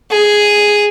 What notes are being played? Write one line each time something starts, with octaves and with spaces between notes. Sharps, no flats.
G#4